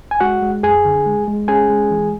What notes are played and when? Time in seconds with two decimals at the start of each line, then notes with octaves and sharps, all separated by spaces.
0.11 G#5
0.20 G#3 F#4 F#5
0.42 G#3
0.63 F#2 G#4 G#5
0.85 D3
1.06 G#3
1.28 G#3
1.48 C#4 G#4 G#5
1.70 G#3
1.91 E3